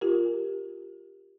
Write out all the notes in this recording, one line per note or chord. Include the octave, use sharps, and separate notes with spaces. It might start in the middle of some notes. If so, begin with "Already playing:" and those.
F4 G4 A#4